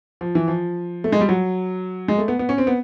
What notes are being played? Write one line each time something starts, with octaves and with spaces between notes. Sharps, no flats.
F3
E3
F3
A3
G#3
G3
F#3
G#3
A3
B3
B3
C#4
C4
B3